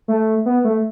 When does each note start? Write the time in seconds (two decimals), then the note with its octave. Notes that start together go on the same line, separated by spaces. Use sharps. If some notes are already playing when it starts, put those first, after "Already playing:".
0.08 A3
0.46 B3
0.64 A3